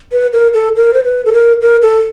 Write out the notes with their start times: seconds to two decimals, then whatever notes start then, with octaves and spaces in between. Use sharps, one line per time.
0.12 B4
0.33 A#4
0.54 A4
0.76 A#4
0.93 C5
1.04 B4
1.25 A4
1.33 A#4
1.62 A#4
1.82 A4